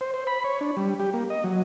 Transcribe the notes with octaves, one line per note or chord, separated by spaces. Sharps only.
C5
C5
B5
C#5
D4
G3
G4
A#3
D#5
F#3